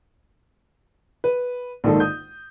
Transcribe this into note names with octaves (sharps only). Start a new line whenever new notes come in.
B4
A#1 G#2 D#3 D#4 A4
D#6 G6